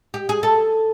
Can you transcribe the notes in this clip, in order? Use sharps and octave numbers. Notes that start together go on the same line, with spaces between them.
G4
G#4
A4